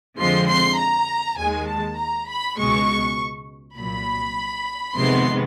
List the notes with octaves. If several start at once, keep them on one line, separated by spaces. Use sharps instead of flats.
F2 D3 F3 G#3 C4 C6
C6
A#5
D#2 D#3 G#3 G#5
A5
A#5
B5
C#2 B2 G#3 C#6
C2 A#2 F#3 B5
F2 C3 D#3 G#3 B3 C6